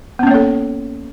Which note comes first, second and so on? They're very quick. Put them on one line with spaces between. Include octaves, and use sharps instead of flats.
B3 C#4 A#3 C#5 A4